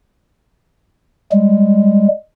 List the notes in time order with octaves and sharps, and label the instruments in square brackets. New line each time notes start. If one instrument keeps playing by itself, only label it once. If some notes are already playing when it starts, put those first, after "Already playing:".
[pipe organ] G3 G#3